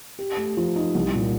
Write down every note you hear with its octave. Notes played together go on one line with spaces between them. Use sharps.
G4
A3
F3
D#4
C2
A#2